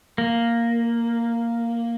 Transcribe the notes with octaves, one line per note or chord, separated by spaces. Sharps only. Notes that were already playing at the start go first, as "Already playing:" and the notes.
A#3